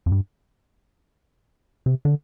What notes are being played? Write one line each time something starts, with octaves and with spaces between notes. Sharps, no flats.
F2
G2
C3
D3